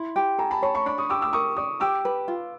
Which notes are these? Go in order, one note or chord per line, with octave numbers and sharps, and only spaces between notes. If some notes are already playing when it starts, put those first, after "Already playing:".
Already playing: E4 C6
G4
A4 G#5 A#5
A5 B5
C#5 A5 B5
B5 C#6
D4 B5 C#6
C#6 D#6
G4 D6 E6
D6 E6
A#4 C#6 D#6
D5 C#6 D#6
G4 D6 E6
B4
F4